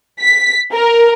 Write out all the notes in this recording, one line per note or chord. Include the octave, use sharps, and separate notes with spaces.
B6
A#4